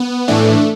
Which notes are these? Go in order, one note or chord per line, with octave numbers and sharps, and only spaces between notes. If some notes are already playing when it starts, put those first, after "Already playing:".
Already playing: B3
A2 E3 A3 D4